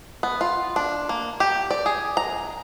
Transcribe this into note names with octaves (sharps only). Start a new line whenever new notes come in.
B3
F4
D4
A#3
G4
D5
G#4
A#5